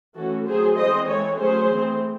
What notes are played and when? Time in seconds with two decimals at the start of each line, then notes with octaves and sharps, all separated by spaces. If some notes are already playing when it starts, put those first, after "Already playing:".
0.15 E3 A3 C#4 F#4 A4
0.46 F#3 A3 C4 G#4 C5
0.76 E3 G#3 C4 C5 D#5
1.07 E3 G#3 C4 A4 C#5
1.38 F#3 A3 C#4 G#4 C5
1.69 E3 A3 C4